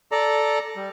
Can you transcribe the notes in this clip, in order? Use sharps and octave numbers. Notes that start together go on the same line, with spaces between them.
A4 D5 A#5
G3